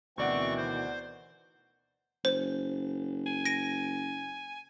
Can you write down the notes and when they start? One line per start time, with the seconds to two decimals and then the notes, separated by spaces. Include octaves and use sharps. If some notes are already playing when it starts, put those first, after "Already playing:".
0.18 D2 B2 D#3 E3 C4 D5 F#5 C#6
0.57 C5
2.25 F#1 C5
3.26 G#5
3.45 A#6 D7